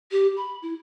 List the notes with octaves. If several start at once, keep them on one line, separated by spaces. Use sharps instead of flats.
G4
B5
E4